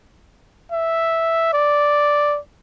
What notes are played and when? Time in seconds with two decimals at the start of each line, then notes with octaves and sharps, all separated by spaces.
0.72 E5
1.53 D5